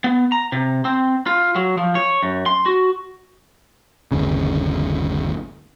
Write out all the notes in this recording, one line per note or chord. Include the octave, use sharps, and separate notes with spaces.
B3
A#5
C3
C4
F4
F#3
F3
C#5
F#2
C6
F#4
G1 D#2 C#3